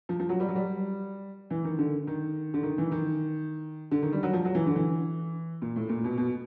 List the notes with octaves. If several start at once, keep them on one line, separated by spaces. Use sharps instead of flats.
F3
F3
F#3
G3
F#3
G3
E3
D#3
D3
D#3
D3
D#3
E3
D#3
D3
D#3
G3
F#3
F3
F#3
E3
D3
E3
A#2
A2
A#2
B2
B2